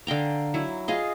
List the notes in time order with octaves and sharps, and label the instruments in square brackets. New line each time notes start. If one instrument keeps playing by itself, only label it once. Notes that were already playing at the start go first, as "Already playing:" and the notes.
[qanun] D3 F5 G5 A#5
F#3 E4
F4 G#4 D#5